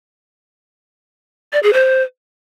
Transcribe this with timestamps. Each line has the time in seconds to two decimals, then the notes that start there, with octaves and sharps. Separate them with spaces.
1.53 D5
1.63 G#4
1.73 C5